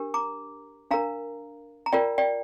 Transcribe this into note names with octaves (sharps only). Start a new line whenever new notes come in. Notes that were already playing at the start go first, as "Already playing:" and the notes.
Already playing: D4 G4 A#4
A#5 D6
D4 A#4 F5 A#5
A#5
F4 A#4 D5 G5
D5 G5